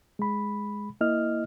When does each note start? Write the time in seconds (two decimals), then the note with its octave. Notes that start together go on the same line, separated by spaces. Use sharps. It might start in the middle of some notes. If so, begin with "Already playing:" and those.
0.19 G#3 B5
1.01 A#3 E4 D#5 F6